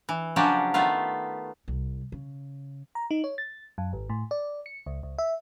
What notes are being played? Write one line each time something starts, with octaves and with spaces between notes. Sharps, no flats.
E3
C#3 F3 F#3 D4 F#4 G4
D#3 A3 B3 F4
C2
C#3
A#5
D#4
C#5
A6
F#2
G#1
A2
D5
C#7
C#2
C#2
E5